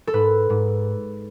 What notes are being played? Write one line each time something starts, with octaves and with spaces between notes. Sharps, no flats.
A4
G#2 B4
G#2